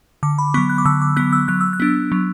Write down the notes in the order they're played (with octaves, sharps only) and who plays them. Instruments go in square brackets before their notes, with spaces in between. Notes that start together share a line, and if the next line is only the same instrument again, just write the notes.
[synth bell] D3 D6
B5
F#3 B3 C#6
F#6
D6
D3 E6
D6
F#3 B3 F#6
E6
F#3 F#6
E6
F#6
B3 D4
F#3